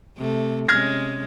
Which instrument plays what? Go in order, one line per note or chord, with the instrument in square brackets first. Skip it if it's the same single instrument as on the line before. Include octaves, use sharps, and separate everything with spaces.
[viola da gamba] C3 A3
[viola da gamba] C3 G#3 C#4 [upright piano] F6 G#6 A#6